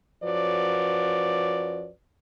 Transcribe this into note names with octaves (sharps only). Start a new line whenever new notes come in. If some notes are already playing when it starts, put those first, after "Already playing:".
F#2 F3 F#3 B4 D5